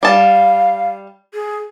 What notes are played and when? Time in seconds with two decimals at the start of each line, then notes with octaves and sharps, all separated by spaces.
0.03 G3 F5 A5
1.34 G#4